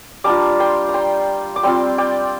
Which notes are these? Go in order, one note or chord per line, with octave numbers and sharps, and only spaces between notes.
G3 D4 F4 A#5 D6
G5 C6
A#5
G5 C6
D6
G3 C4 F4 G5 C6
D5 G5